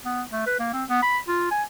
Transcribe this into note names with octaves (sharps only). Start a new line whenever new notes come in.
B3
A3
B4
A#3
C4
B3
B5
F4
G#5